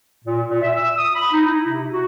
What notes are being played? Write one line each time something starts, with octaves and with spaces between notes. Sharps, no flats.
A#2
A#2
E5
E6
D#6
B5
D#4
E4
C3
F#4